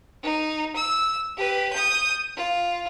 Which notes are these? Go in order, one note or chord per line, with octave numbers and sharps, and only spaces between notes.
D#4
E6
G4 B4
D#6 G6
F4